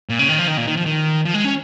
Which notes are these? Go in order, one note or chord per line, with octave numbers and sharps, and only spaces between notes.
A#2
C#3
D#3
F3
D#3
A#2
D#3
F3
D#3
F3
G#3
C#4